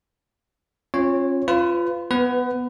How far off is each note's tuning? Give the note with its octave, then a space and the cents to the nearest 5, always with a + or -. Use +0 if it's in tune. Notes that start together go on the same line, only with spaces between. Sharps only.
C#4 -40 F4 +0 C#5 -10
F4 -15 B4 +30
B3 +0 B4 +25